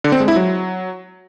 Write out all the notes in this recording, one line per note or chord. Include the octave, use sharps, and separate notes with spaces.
D3
C4
G#3
E4
F#3